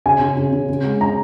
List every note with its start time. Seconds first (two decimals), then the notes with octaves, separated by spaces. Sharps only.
0.06 C#3 G#5
0.21 C#3
0.37 C#3
0.53 C#3
0.69 C#3
0.85 G#3
1.00 C#3 A#5